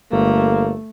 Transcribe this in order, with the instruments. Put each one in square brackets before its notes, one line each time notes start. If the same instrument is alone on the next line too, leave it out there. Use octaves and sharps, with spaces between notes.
[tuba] G1 [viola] A3 [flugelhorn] A#3